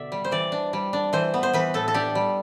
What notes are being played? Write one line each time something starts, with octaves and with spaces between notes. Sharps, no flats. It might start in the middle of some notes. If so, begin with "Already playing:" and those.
Already playing: B2 D3 D5 E5
G3
C5
E3 D5
D4
G3
D4
E3 C5
B3
C5
E3 B4
A2 A4
A4
D4 G4
G3